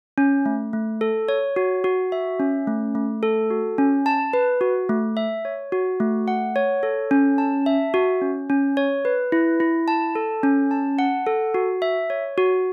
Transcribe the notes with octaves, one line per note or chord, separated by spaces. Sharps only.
C#4
A3
A3
A4
C#5
F#4
F#4
E5
C#4
A3
A3
A4
F#4
C#4
A5
B4
F#4
A3
E5
C#5
F#4
A3
F#5
C#5
A4
C#4
A5
E5
F#4
C#4
C#4
C#5
B4
E4
E4
A5
A4
C#4
A5
F#5
A4
F#4
E5
C#5
F#4